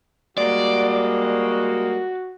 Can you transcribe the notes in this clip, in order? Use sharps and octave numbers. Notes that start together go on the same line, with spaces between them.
G3 G#3 A#3 F#4 D5